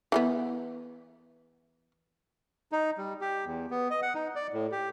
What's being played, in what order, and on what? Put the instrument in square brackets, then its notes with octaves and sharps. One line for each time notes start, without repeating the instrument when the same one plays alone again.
[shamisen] E3 G#3 B3
[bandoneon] D#4
G3
G4
E2
B3
D#5
F#5
D#4
D5
A2
G4